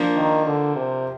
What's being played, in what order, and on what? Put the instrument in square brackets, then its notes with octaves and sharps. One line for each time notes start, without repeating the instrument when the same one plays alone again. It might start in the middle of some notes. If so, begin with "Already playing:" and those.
Already playing: [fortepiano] F3 A#3 D4
[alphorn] D#3
D3
C3